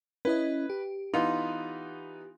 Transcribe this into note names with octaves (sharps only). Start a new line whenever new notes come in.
C#4 E4 B4 D#5
G4
E3 B3 D#4 F4